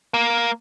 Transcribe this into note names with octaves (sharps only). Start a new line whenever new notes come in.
A#3